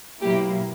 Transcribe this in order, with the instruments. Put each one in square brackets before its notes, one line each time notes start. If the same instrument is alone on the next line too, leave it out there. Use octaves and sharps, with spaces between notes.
[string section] B2 F#3 A#3 E4 G4